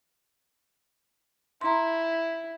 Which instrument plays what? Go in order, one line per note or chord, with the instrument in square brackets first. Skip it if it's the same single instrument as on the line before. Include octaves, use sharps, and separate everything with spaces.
[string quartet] E4 [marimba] A#5 C6